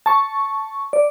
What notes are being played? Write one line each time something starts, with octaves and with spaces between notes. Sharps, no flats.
A5 C#6
D5